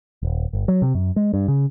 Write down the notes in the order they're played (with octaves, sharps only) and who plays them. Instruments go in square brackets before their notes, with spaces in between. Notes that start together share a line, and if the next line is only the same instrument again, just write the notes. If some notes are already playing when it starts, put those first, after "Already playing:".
[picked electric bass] D#1
G1
F#3
C3
F#2
G#3
G2
C#3